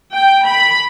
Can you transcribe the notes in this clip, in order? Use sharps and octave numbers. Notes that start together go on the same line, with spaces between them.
G5
B5